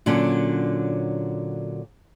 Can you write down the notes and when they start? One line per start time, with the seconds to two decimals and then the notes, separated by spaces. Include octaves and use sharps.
0.06 A#2 D3 F#3 C#4 D4